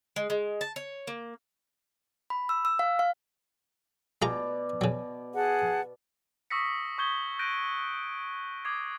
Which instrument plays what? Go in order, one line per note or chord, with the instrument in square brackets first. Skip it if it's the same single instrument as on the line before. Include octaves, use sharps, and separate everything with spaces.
[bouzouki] G#3
G#3
A5
C#5
A#3
[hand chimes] B5
E6
E6
F5
F5
[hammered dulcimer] B2 D5 [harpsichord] G#3 F4 A#5
[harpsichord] C#3 F#3
[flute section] G#4 F#5 A5
[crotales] C#6 D#6 E6 A#6 B6 C#7
C#6 D#6 G6 G#6 B6 G7
F#6 G6 A#6 D7 D#7
D6 D#6 G#6 C7